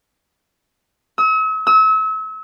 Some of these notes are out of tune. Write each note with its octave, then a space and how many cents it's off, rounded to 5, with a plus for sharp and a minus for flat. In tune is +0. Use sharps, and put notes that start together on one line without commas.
E6 -45
E6 -35